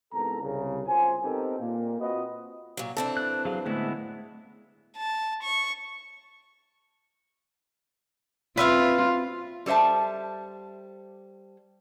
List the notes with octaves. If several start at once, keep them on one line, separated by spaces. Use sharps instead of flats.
C2 G#2 B3 A4 A#4 A#5
C2 C#3
F#1 F4 C5 G#5
B3 C4 D#4 G4 A4 A#4
A#2 A#3
C4 F4 F#4 B4 C5 D#5
A#2 F#3
E3 C4 D4 A4
F#6
F#3 G#4 F5
D2 A2 G#3 B3 E4
A5
C#6
C4 F4 B4 E5 F5
G3 A4 C5 E5 A5